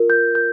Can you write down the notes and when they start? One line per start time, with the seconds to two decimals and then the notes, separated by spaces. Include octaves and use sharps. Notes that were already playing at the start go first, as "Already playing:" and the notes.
Already playing: F4 A#4
0.10 G6
0.35 A#4 G6